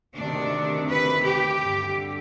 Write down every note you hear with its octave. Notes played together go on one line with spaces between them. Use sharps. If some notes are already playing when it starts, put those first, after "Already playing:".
D2 C3 D#3 D4
B4
G4
G2 D3